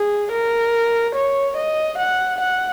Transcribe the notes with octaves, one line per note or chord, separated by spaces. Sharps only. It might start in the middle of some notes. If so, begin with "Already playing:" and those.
Already playing: G#4
A#4
C#5
D#5
F#5
F#5